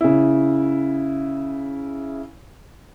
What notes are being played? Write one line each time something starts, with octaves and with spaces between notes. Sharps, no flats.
C#3 E4